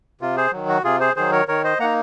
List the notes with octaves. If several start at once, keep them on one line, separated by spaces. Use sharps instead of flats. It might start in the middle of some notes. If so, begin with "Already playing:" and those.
C3 F4
G#4 C5
D#3 F#3
F#4
C3 F4 G#4
G#4 C5
D#3 F#3 G#4 C5
A#4 C#5
D#3 A#4 C#5
C5 D#5
A#3 D#4 F#5 A#5